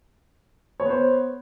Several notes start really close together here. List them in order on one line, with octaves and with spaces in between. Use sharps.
C#5 B3 C5